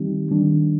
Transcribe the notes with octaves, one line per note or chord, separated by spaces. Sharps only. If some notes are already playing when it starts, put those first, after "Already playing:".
Already playing: D#3 G3 C4 D#4 G4
D#3 G3 D4